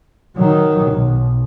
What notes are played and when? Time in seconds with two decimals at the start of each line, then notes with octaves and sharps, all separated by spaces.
0.37 D#3 F#3
0.92 B1